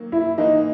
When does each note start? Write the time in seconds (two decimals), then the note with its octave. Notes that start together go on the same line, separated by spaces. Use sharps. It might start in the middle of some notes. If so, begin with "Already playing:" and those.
Already playing: D#3 F#3 A#3
0.12 E4
0.38 G#2 E3 A#3 D#4